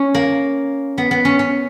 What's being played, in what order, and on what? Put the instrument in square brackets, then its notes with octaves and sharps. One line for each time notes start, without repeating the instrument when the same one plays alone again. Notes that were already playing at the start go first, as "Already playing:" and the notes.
Already playing: [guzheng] C#4
A#3
B3
B3
C#4
C#4